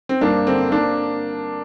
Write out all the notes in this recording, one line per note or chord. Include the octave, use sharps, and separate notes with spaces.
C4
G2 A#3 D4
D3 C4
A#3 D4